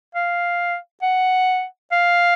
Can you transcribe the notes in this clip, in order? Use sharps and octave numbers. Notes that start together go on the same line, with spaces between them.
F5
F#5
F5